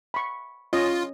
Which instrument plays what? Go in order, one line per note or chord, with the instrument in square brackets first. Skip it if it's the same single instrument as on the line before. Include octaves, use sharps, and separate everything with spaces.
[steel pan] B5 C#6
[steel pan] C#4 C#5 D#5 [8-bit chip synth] F4